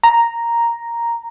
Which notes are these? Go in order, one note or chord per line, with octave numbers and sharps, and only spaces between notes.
A#5